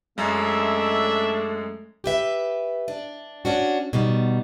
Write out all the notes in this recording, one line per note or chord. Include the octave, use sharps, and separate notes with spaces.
F#2 G#3 A3 C#4 D4 E5
G4 B4 E5
D4
C#4 D4 F#4
B2 D#3 G3